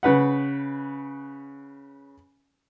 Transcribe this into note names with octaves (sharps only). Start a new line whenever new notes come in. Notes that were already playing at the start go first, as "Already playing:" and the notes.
C#3 B4 F#5